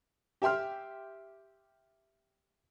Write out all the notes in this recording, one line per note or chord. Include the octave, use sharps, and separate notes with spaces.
G4 E5 G5 C6 F6